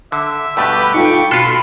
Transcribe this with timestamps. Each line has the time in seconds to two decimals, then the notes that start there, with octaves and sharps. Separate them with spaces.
0.12 D3 E5
0.57 G2 B2 A3 G4 B4
0.94 D#4 F4 A4 G5 C#6
1.31 B2 F4 A4 B5 C6 F6 A#6